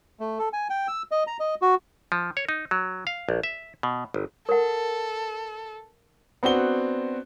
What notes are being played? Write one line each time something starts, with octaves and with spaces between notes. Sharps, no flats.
A3
A4
G#5
G5
E6
D#5
A#5
D#5
F#4
F3
C#5
D#4
F#3
F5
A#1
E5
B2
G1
A4 A#4 F#5
B3 C4 D4 F#4 G7